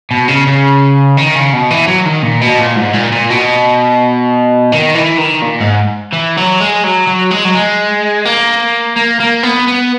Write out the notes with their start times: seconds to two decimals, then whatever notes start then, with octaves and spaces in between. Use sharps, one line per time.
0.11 B2
0.28 C#3
0.47 C#3
1.17 D#3
1.35 C#3
1.53 B2
1.70 E3
1.88 F#3
2.06 D#3
2.23 A#2
2.41 B2
2.59 A#2
2.77 G#2
2.94 A#2
3.12 A#2
3.30 B2
4.72 D#3
4.95 E3
5.18 D#3
5.42 A#2
5.61 G#2
6.13 E3
6.37 F#3
6.61 G#3
6.84 F#3
7.08 F#3
7.31 G#3
7.45 F#3
7.55 G#3
8.25 A#3
8.97 A#3
9.20 A#3
9.43 B3
9.68 B3